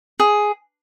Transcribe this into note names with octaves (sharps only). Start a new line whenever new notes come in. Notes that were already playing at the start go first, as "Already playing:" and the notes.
G#4